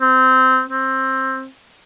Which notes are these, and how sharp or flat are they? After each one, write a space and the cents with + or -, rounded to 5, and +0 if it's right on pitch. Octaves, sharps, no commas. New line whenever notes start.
C4 -15
C4 +15